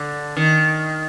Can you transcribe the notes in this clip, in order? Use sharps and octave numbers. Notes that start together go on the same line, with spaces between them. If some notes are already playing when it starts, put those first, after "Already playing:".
Already playing: D3
D#3